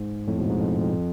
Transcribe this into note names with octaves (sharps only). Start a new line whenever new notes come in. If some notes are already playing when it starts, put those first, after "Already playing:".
Already playing: G#2
F2 A2
G#2 B2
G#2
F2
F2